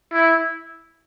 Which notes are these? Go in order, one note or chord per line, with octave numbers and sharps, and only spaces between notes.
E4